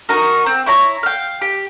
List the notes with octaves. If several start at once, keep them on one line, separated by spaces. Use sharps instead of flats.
D#4 F#4 A#4
C4
E4 C#5 A#5
F5 G5
G4